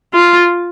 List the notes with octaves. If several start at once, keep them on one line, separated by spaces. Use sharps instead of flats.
F4